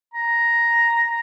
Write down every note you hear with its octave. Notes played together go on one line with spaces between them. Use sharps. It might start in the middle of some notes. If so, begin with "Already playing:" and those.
A#5